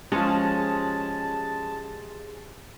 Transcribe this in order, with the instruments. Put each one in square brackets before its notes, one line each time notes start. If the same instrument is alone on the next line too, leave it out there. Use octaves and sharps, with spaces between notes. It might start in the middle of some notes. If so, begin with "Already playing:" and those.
[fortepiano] F3 G#3 [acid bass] C#4 [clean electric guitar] G4 G#4 C5 [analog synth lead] A5